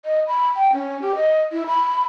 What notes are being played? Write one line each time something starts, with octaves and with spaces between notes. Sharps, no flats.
D#5
B5
G5
C#4
G4
D#5
E4
B5